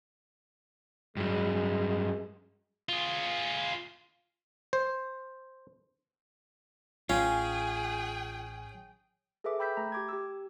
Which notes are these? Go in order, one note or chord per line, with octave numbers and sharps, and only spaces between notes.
G2 F#3 G#3
F4 G#4
C5
A1 C#4 F4 G#4 G5
G#4 A4 B4 E5 D6
G5 B5 E6 G6 B6
A3 A#5
G4 D6 G#6
G4 E6